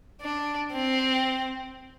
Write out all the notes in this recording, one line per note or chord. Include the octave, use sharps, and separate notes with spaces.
D4
C4